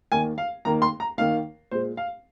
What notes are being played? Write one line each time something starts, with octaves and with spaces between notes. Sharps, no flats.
D#2 D#3 A#3 G#5
F5
D#2 D#3 A#3 A#5
C6
A#5
D#2 D#3 A#3 F5
A#2 G#3 C5
F5